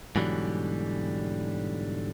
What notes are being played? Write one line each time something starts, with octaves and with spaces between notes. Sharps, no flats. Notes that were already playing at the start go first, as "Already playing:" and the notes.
G#2 B2 D3 E3 F#3 G3